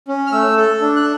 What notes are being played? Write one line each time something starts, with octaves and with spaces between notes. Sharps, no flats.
C#4
F6
A3 E6
A4
D4
F#6